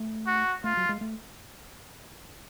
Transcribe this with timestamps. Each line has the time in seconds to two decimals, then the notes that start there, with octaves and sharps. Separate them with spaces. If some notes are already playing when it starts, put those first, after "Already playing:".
Already playing: A3
0.27 F#4
0.64 A3 F4
0.77 F#3
0.89 G#3
1.01 A3